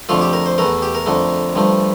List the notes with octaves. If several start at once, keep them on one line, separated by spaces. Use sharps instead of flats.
F2 D3 F3 A3 F4
G4
A#4
C5
E2 E3 A3 A#4
G4
A#4
F2 D3 A3
G2 F3 A3